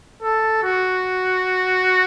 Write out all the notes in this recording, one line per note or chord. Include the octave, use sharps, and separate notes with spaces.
A4
F#4